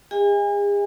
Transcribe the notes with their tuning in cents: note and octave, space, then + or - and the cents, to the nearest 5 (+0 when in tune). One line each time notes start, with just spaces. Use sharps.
G#4 -40 D#5 +25 G#5 -35